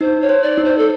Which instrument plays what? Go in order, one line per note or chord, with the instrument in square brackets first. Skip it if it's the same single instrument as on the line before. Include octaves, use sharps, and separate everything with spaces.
[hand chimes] D#4 [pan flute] C5
[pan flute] C#5
[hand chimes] C5
[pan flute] D5
[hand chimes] D#4
[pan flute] C5
A4